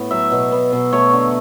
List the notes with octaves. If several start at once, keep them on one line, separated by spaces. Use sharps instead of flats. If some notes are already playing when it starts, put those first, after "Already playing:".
Already playing: A2 B3
F#3 E5
B2
B3
B2
A3 C#5
D3